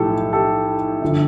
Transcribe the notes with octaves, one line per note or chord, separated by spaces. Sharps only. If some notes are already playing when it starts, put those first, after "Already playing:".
Already playing: B1 A2 F3 G4 A4
G4 A4
G1 D3 F3